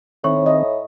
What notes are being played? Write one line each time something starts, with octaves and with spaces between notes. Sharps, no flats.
A2 D#3 C4 C#5 C#6
D#5